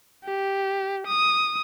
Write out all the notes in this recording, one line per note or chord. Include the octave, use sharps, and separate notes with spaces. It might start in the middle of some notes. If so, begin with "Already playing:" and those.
G4
D#6